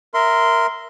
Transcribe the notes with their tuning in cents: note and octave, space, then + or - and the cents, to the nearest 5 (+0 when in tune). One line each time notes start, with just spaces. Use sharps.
A#4 +0 E5 +0 C6 -15